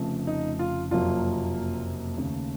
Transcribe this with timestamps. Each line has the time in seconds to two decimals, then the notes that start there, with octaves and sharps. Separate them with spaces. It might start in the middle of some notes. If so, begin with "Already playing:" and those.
Already playing: F1 F2 C#3 F3 A3
0.27 D#4
0.59 F4
0.91 F#1 F2 C3 F#3 A#3 F4
2.17 D#2 C#3 A3